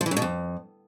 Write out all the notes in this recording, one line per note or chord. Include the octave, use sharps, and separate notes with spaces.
F3
E3
F#2
B2
F2